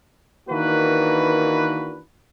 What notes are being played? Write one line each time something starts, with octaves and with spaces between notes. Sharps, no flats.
D#3 E3 A#3 D4 F#4 B4